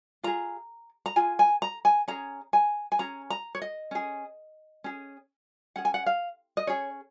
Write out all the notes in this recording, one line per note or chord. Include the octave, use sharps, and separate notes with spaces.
F4 G#4 A#5
A#5
F4 G#4 G#5
G#5
A#5
G#5
C#4 G#4 A#5
G#5
G#5
C#4 G#4 A#5
A#5
C#5
D#5
C#4 G#4
C#4 G#4
C#4 G#4 F#5
G#5
F#5
F5
D#5
C#4 G#4 C#5